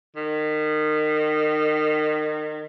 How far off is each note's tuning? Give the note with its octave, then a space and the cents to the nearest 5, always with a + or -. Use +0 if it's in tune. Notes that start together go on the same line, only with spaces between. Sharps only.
D#3 -30